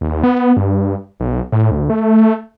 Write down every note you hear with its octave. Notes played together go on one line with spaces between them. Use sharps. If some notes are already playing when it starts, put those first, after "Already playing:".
D#2
B3
G2
B1
A2
D2
A3